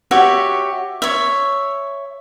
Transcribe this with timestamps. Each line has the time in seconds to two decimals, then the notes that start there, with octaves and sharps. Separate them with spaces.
0.11 F#4 G4 C#5 E5
1.02 C#5 E5